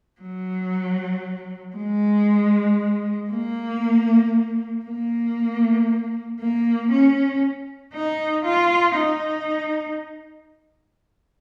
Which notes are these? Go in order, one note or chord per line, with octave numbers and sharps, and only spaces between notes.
F#3
G#3
A#3
A#3
A#3
C#4
D#4
F4
D#4